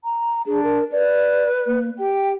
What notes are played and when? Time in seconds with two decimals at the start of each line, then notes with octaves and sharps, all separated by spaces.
0.04 A#5
0.46 D4 G#4
0.63 A#4
0.92 B4 D5
1.66 A#3
1.99 G4 G5